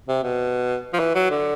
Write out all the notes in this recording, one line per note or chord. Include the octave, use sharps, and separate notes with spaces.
C3
B2
F3
E3
F#3
D3